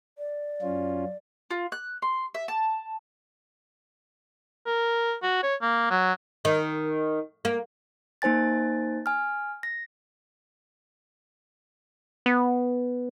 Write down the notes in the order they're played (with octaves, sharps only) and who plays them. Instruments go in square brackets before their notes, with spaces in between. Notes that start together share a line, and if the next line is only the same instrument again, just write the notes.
[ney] D5
[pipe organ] F#2 C#4 F4
[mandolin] F4
F#6
C6
E5
A5
[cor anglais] A#4
F#4
C#5
A#3
F#3
[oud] D#3
A#3
[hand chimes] A#3 D#4 C5 G#5 A6
G#5 F6
A#6
[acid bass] B3